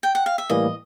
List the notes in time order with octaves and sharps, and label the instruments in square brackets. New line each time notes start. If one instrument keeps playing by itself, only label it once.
[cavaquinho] G5
F#5
F5
E5
[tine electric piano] A2 E3 G3 A#3 [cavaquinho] D#5